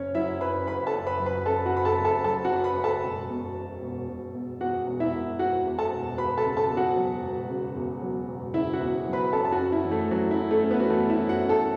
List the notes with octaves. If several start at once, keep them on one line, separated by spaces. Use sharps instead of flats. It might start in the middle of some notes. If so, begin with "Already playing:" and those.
Already playing: F#1 C#4 C#5
F#3 E4 E5
F#2 B4 B5
F#1 B4 B5
A4 A5
F#1
B4 B5
F#3
B4 B5
F#2 A4 A5
F#4 F#5
F#1 B5
A4 A5
F#1
A4 A5
F#3 A4 A5
F#4 F#5
F#2
B4 B5
F#1
A4 A5
E1
B2
E2
E1
E1
B2
E2 F#4 F#5
E1
E4 E5
E1
B2 F#4 F#5
E2
A4 A5
E1
E1 B4 B5
A4 A5
C#3
A4 A5
E2
F#4 F#5
F#3
E1
C#3
E2
F#3
E1
C#3 E4 E5
F#4 F#5
E2
F#3
B4 B5
F#2 A4 A5
A5
F#4 F#5
C#4
E4 E5
E3
A3 A4
F#2 F#3 F#4
E4
F#2
A3 A4
C#4
B3 B4
F#4
E3 A3 A4
E4 E5
F#2
F#4 F#5
F#2
A4 A5